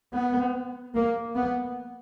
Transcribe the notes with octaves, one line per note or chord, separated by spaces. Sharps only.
B3
A#3
B3